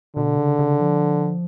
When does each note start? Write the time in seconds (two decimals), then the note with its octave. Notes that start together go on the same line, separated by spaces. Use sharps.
0.17 B2 D3
0.38 C#3
0.59 C#3
0.80 F3